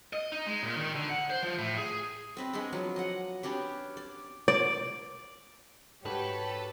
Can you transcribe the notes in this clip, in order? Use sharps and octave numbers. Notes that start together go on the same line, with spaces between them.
D#5
D#4
G#3
A#2
D#3
D3
F#5
C5
F3
A2
G#4
C4 B4 D#5
G#3 B3 D4
F3 F#3
D#5 F#5
B3 C#4 D4 G4
D5
D5
G#2 F#4 G4 A4 B4 C#5